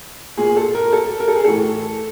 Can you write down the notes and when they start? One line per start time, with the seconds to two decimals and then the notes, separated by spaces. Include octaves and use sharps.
0.37 A#2 G#4
0.56 A4
0.75 A#4
0.93 A4
1.20 A#4
1.28 A4
1.36 G#4
1.45 A2 E3 A4